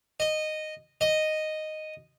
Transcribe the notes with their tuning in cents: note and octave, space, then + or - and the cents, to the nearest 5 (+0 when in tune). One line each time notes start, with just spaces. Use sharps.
D#5 -10
D#5 -5